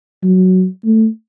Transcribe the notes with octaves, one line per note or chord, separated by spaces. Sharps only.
F#3
A3